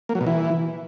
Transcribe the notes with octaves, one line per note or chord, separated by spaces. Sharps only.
A#3
F#3
B2
E3